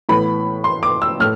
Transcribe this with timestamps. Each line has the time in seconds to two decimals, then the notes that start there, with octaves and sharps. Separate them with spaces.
0.09 A2 E3 B3 B5
0.64 C6
0.83 D6
1.02 E6
1.20 A2 F6